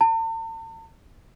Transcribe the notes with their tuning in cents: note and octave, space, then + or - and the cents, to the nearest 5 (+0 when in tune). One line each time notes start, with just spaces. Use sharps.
A5 +45